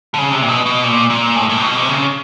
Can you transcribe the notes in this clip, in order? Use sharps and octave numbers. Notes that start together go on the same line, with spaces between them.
D3
C#3
C3
A#2
B2
B2
A#2
A#2
A2
A2
C3
B2
C3
C#3